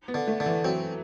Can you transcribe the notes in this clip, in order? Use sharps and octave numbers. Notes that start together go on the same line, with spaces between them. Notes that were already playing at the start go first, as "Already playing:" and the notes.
B3
D3
A3
D3
E3
F#3 C4